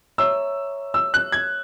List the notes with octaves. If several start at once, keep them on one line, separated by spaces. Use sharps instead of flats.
C#5 E5 A#5 C#6 E6
E6
F#6
G#6